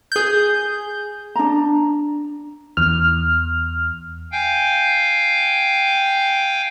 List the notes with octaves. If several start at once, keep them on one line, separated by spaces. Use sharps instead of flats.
G#4 G6
D4 A#5
E2 F6
F5 G5 G#5 G6